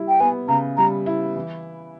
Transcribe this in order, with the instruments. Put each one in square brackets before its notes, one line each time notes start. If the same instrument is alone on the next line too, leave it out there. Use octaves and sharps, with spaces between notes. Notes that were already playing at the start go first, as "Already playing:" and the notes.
Already playing: [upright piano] G3 E4
[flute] G5
[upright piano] B3 [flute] G#5
[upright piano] C#3 [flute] A#5
[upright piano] G3 [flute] A#5
[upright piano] E4
E3